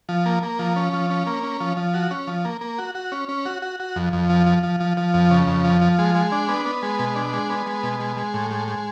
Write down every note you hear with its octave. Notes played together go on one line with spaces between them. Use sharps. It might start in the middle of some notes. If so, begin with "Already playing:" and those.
F3
A#3
A#3
F3
C#4
F3
C#4
A#3
C#4
F3
F3
F#4
C#4
F3
A#3
A#3
F#4
F#4
C#4
C#4
F#4
F#4
F#4
F2
F2
F3
F3
F3
F3
F3
F2
C#3
F2
F3
F3
G#3
G#3
D4
B3
B3
G#3
B2
D4
G#3
B3
G#3
B2
G#3
G#3
A2
G#3
G#3